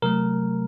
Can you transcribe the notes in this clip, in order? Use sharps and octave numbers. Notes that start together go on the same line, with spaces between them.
C3 F#3 A3 A#4